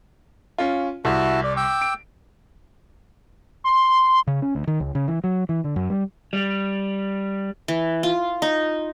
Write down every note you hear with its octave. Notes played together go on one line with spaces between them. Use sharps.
C#4 F4
C2 E4 F#4 A5
D5
G5 D6 E6
D7
C6
C#3
C#4
D2
D#3
C#2
C#3
E3
F#3
E3
D3
F#2
G3
G3
E3
F4
D#4